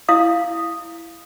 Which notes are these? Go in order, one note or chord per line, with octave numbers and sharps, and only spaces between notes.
E4 F5 D#6